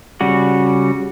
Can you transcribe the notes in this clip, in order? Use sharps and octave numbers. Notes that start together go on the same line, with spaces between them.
C#3 G3 F#4